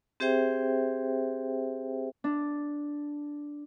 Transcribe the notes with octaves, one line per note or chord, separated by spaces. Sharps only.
C4 G4 G#4 C5 E5 G5
D4